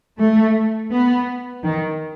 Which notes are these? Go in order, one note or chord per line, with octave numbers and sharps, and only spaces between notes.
A3
B3
D#3